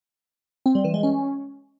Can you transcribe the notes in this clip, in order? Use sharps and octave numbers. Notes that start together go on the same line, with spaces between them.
C4
G3
E3
G#3
C#4